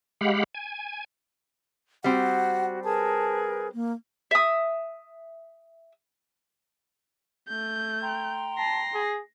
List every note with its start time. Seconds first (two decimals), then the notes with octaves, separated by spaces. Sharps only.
0.21 G#3 G4 F5 F#5 B5
0.55 G#5
2.04 G3 C4 F#4 F#5
2.84 G#4 A#4 B4 A5
3.74 A#3
4.31 E5 D#6
7.48 A3 G6
8.02 G5 A#5 C6
8.58 A5 A#6 C7
8.94 G#4